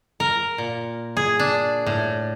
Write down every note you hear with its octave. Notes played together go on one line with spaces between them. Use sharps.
A#4
A#2
G#4
D4
A2